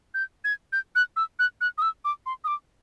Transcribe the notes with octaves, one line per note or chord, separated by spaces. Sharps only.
G6
G#6
G6
F#6
E6
F#6
F#6
D#6
E6
D6
C6
D#6
D6